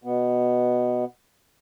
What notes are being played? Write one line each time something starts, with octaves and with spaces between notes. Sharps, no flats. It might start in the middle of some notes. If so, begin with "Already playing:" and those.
B2 B3